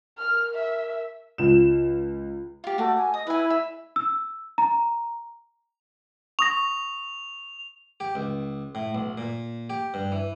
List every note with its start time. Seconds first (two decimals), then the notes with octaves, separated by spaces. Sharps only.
0.19 A#4 F6
0.55 E5
1.38 C#2 E7
2.64 F4 G4
2.78 A3 F#4 D6
2.97 G#5
3.14 D#5 D#6
3.27 E4 B4 G#5
3.50 E5
3.96 E6
4.58 A#5
6.39 C#6 D#6 A#6 F7
8.00 G4
8.15 C#2
8.75 A2
8.95 B1
9.18 A#2
9.70 G4
9.94 G2
10.12 E3